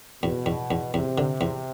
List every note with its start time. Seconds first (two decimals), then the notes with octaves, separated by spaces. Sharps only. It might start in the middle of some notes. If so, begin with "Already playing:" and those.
0.23 E2 B2
0.46 E2
0.71 E2
0.94 E2 C3
1.18 D3
1.41 E2